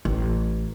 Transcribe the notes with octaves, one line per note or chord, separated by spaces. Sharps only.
A1